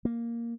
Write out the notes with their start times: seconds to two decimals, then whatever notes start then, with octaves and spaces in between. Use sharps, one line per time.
0.05 A#3